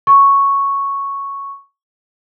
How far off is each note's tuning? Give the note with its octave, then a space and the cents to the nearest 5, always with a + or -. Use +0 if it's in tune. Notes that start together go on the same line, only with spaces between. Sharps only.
C#6 +0